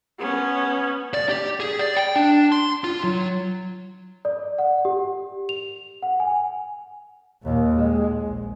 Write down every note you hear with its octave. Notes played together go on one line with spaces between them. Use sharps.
B3 C#4
D5
G4
G#4
D5
G5
D4
C6
F4
F#3
D5
F#5
G4
F7
F#5
G#5
D#2 A#2
G#3
A#1 A#2